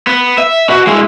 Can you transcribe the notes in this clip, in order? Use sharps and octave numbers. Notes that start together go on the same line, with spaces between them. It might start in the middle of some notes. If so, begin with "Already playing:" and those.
B3
E5
F#4 B4
G#3 E4